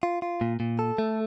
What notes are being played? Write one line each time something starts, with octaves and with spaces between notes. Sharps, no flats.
F4
F4
A#2
A#2
A4
A3